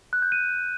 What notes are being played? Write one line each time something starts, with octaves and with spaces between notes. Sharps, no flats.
F#6
G6
D#7